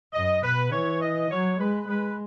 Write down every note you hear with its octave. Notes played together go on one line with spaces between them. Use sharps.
F#2 D#5
B2 B4
E3 C#5
D#5
F#3 C#5
G#3 B4
G#3 B4